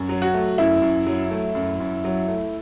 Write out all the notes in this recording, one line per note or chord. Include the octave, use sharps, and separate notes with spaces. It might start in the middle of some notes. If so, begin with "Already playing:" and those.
Already playing: F#2
F#3
F#4
A3
F#2 E4
F#2
F#3
A3
F#2
F#2
F#3
A3